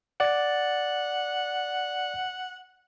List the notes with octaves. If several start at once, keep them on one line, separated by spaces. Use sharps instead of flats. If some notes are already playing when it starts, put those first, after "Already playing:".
D5 F#5 A6